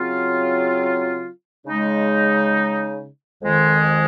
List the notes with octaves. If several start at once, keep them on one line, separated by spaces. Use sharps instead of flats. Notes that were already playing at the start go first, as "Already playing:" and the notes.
Already playing: C#3 F#3 C4 F4
C#3 G#3 D#4
F2 D#3 G#3